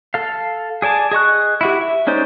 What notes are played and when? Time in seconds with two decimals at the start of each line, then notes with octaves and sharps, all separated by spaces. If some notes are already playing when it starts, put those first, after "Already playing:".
0.14 A4 F5
0.82 G#4 D5 G#5 A5
1.11 G#4 D#5 C#6 F#6
1.61 E4 F#4 G4
1.81 E5
2.07 G#3 C#4 D#4 C5 D5